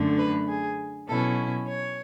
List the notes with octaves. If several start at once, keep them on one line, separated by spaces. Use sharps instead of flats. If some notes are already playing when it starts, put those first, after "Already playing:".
Already playing: F#2 D3 A3
B4
G#4
B2 F#3 C#4 E4 A4
C#5